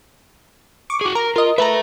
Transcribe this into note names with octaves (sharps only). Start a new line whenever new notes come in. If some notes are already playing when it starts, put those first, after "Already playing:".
C#6 D6
F#4 G#4
A#4 A#5
F4 A#4 D#5
A4 B4 E5 A#5